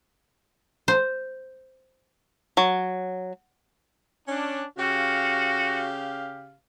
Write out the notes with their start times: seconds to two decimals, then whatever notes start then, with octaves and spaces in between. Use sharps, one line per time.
0.88 C5
2.57 F#3
4.28 C#4 D4
4.78 C#3 F#4 G4 F5